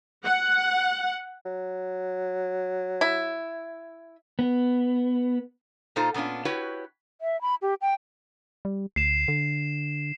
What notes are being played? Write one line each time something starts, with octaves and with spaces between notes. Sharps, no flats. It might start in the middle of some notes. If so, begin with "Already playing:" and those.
F#5
F#3
E4
B3
A#2 D#4 F4 A4 C5 A#5
A#2 B3 C#4 D4 F4
E4 F#4 G4 B4 C#5
E5
B5
G4
G5
G3
D2 C7 E7
D3